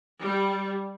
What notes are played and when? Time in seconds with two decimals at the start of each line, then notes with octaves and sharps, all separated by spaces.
0.21 G3